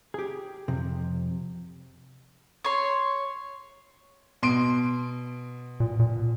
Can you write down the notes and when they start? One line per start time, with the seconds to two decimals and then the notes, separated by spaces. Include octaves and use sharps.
0.14 G4 G#4
0.68 F2 C3
2.64 C#5 C6
4.43 B2 C6 D7
5.80 A#2
6.00 A#2